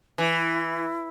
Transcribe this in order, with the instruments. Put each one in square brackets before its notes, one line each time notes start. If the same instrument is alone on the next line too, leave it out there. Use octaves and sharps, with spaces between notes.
[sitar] E3 [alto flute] E4